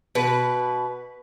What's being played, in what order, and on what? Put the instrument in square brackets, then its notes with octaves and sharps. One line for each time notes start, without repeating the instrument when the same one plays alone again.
[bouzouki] B2 [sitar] B4